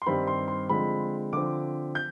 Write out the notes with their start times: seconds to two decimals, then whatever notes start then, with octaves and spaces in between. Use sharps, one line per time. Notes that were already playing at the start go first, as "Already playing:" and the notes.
0.02 C6
0.06 G2 D#3 G3 C4 B5
0.27 C6
0.48 C6
0.69 D3 F3 G#3 C4 B5
1.33 D3 F3 C4 D6
1.95 G6